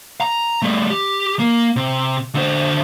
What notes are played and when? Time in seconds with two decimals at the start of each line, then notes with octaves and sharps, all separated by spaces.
0.21 A#5
0.62 G3 A3
0.90 G4
1.39 A#3
1.76 C3
2.35 D3 C5